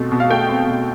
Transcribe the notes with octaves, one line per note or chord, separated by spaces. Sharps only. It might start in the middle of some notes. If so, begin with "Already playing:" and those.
Already playing: B2 A3 C4
B2
F5
A3 G5
C4
B2